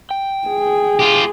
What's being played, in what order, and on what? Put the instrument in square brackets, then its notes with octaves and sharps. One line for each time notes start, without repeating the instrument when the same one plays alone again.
[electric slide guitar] G5
[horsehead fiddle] G#4
[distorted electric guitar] F4 G4